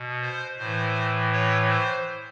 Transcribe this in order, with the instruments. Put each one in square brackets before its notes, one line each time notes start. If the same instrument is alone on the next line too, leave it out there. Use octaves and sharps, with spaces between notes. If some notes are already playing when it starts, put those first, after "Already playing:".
Already playing: [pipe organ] B2
C5
A2 E3 C5
C#5
C5